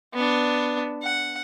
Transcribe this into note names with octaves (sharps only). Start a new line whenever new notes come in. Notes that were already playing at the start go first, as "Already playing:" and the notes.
B3 D4
F#5